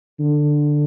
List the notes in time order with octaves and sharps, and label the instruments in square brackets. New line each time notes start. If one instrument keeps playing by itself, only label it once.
[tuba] D3